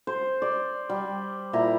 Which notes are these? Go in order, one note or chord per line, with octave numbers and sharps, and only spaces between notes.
C5
D5
G3
A#2 E4 A#5